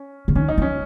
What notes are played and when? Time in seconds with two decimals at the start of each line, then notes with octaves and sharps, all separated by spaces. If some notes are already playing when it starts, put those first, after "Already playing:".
Already playing: C#4
0.28 C#3
0.35 D#3 C#4
0.48 D#4
0.58 F3
0.62 C#4